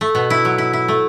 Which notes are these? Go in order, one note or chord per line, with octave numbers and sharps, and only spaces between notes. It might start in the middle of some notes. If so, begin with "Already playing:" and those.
A3
B2
E4
F#3
E4
E4
A3